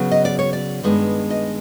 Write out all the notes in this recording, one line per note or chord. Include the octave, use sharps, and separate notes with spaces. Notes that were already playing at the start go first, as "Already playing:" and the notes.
Already playing: C#3 F#3 B3
D#5
D5
C#5
D5
G2 D#3 G#3 B3
D#5